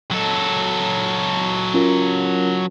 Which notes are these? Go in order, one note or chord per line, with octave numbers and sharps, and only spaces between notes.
F#3 A4
C#4 F4 A#4